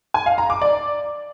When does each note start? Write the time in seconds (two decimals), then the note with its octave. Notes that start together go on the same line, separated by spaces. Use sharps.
0.14 G#5
0.26 F5
0.38 A#5
0.50 D6
0.62 D5